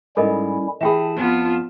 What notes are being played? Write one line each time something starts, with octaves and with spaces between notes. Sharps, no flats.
G#2 G3 C#4 E4 A4 A#4 D#5
E3 G4 G#4 E5 G5 A5 B5
F2 B3 F4